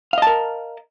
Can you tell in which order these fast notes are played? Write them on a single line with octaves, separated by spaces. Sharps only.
F5 D#5 A5 A#4